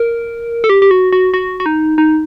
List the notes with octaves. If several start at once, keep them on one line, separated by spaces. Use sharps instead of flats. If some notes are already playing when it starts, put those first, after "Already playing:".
Already playing: A#4
A4
G4
G4
F#4
F#4
F#4
F#4
D#4
D#4